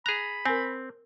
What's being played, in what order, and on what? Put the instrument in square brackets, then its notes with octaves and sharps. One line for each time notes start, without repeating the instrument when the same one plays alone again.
[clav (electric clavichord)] G#4 A#5 [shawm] B5 [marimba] F#6
[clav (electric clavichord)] C4 [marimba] A#4 G#5